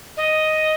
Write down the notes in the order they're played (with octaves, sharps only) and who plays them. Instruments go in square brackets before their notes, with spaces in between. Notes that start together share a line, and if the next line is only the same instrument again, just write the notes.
[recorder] D#5